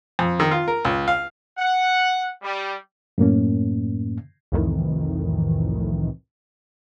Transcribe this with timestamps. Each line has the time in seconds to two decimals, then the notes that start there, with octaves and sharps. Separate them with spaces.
0.19 F2
0.40 D#3
0.51 F4
0.68 A#4
0.85 C#2
1.08 F5
1.58 F#5
2.42 G3
3.18 F#2 A2 A#3 C#4
4.52 C2 F2 A2 D#3 E3